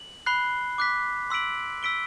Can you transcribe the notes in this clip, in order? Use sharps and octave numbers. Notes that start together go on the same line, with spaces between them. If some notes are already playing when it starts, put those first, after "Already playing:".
Already playing: F#7
B5 F#6 C7 G7
D6 F#6 B6
C6 E6 B6 D7 F#7
E6 B6 D7 G7